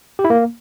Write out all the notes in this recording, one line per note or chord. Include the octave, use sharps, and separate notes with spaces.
G4
E4
A#3